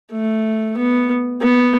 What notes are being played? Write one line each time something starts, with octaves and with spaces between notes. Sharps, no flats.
A3
B3
B3